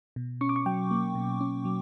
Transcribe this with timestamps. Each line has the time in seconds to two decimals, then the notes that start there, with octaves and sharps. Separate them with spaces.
0.16 B2
0.41 C#4 C#6
0.49 D6
0.56 C#6
0.66 F#3 G5
0.91 A#3
1.15 B2
1.41 C#4
1.65 F#3